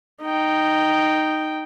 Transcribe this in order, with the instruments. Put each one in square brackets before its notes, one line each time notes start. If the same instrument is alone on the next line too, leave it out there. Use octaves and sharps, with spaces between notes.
[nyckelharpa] D#4 G5